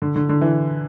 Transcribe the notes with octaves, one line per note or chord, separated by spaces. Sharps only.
D3
D3
D3
E3